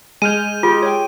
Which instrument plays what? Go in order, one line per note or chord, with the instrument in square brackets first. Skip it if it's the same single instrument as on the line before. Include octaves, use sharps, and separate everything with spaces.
[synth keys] G#3 F6 G6 [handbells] G#5 [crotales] D#7
[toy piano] F4 [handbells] G4 G#4 C6
[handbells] C#5 G5